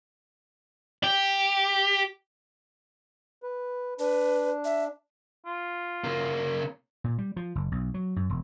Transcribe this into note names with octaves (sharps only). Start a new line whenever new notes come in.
G4
B4
D4 B4
E5
F4
C#3 A#3
A#2
G3
F3
F#1
B1
F#3
F#2
E1